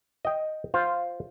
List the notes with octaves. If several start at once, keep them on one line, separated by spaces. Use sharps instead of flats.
D#5 G5
F4 C5 F5